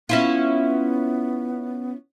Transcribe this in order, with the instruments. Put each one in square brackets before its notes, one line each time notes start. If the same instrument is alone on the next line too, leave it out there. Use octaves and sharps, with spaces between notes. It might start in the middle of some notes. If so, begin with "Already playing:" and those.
[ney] B3 [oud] C#4 E4 F4